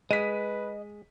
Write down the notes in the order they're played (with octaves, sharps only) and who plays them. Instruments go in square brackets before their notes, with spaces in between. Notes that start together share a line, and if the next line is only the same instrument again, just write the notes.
[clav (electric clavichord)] G#3 [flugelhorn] B4 [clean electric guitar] D#5 [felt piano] B6 D#7